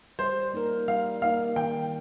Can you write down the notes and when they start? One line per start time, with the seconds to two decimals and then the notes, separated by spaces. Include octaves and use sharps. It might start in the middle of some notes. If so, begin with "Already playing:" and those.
0.19 G3 C5
0.54 A#3 D#4 A#4
0.88 G3 F5
1.22 A#3 D#4 A#4 F5
1.56 D#3 G5